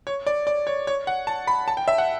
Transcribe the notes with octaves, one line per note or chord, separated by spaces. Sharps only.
C#5
D5
D5
C#5
C#5
F#5
A5
B5
A5
G5
E5
F#5